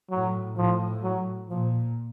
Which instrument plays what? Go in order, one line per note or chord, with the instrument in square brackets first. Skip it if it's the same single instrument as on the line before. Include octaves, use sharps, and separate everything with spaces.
[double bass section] A2 [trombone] F#3
[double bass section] A2 [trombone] F3
[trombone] F#3
[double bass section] A#2 [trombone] F3